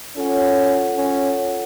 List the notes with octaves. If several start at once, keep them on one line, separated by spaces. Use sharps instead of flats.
C#4 F4 A4 C#5 F#5
C#4